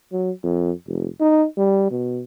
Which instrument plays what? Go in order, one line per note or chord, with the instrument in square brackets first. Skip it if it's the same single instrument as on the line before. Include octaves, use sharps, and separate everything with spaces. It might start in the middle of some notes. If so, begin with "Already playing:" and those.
[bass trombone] F#3
F2
F1
D#4
G3
B2